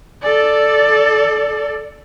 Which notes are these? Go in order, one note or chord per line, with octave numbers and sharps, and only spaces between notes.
A4 D5